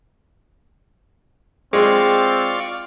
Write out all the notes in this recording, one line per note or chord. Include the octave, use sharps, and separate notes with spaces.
G#3 C4 F4 D5 C#6